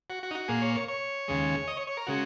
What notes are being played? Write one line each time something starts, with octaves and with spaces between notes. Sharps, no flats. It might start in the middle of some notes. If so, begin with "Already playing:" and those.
F#4
F#4
D#4
F#4
A#2 A#3 G#4
C#5
C#5
C#5
D#2 C#3 G#3
D#5
C#5
C#5
A#4
C#3 G#3 F#4